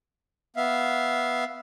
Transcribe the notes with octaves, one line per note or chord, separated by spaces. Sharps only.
B3 E5 F5